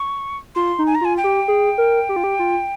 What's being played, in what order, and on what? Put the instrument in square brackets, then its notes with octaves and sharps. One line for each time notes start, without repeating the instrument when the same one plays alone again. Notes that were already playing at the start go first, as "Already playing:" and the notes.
Already playing: [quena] C#6
[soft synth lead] F4 [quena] C6
[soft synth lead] D#4
[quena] G#5
A#5
[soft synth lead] F4 [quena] G#5
[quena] G5
[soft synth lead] G4
G#4
A#4
G4
F4
G4
F4